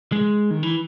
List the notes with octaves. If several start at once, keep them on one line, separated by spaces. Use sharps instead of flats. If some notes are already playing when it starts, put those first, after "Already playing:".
G#3
D#3
E3